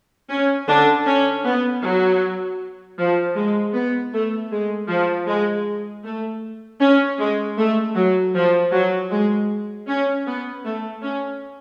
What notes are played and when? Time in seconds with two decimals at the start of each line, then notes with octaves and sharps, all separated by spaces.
0.30 C#4
0.68 D3 D4
1.06 C#4
1.45 B3
1.84 F#3
2.98 F3
3.36 G#3
3.74 B3
4.13 A3
4.51 G#3
4.89 F3
5.28 G#3
6.04 A3
6.81 C#4
7.19 G#3
7.58 A3
7.96 F#3
8.34 F3
8.72 F#3
9.11 G#3
9.88 C#4
10.26 B3
10.64 A3
11.02 C#4